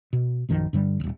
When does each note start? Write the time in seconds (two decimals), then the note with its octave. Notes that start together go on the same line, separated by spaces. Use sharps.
0.13 B2
0.49 A#1 F#2 D#3 F3
0.73 G2 D3 G3
1.00 D#1 A#1